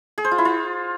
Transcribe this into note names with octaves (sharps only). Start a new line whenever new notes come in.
G#4
C5
F4
E4
F4